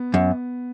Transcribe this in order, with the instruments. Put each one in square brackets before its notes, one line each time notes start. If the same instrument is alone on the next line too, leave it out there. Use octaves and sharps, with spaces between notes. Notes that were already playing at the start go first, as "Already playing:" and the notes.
Already playing: [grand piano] B3
[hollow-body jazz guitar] F#2